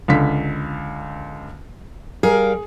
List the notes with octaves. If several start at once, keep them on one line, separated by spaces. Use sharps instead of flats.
C#2 D3 B6
G3 G#4 A#4 F5